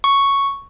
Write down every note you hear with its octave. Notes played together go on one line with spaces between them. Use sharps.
C#6